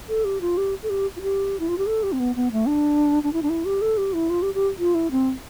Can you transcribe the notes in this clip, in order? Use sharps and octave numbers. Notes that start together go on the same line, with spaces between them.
A4
G4
F4
G4
A4
G4
F4
G4
E4
F4
G4
A4
G4
C4
B3
B3
A3
D4
D4
E4
D4
E4
G4
A4
G4
E4
F4
G4
G4
F4
E4
C4